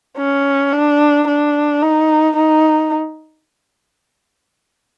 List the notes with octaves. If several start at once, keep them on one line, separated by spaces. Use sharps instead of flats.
C#4
D4
D4
D#4
D#4